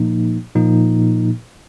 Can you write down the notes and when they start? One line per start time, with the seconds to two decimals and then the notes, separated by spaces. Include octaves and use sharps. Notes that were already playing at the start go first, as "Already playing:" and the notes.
Already playing: A#2 F3 A#3 D#4
0.55 A#2 F3 A#3 D#4